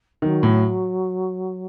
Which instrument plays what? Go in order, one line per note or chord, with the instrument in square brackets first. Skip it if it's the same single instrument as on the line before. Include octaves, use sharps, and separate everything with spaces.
[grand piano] D#3 [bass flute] F#3
[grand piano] A2